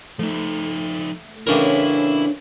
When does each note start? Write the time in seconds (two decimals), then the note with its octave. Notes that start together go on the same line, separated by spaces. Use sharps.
0.19 F3 A3 D#4
1.47 A1 C#3 D4 E4 A#4 C#5 E5